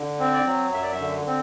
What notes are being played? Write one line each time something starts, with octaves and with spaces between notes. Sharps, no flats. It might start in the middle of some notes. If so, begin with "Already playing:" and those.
Already playing: D3
C4
D5
F#3
F#2 E5
D5
E5
D3
C4